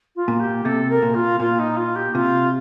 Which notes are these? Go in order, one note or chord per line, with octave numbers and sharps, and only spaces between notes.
F4
A#2
G4
C3 A4
A#4
A#2
F4
A#2 F4
D#4
F4
G4
C3 F4